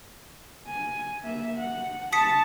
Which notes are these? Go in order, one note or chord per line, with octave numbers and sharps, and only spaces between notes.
G#5
A#3 E5
F#5
A5 D#6 B6 C#7